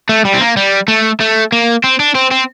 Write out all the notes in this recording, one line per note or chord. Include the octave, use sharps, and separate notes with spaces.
A3
G3
C4
A#3
G3
A3
A3
A#3
C4
D4
C4
C4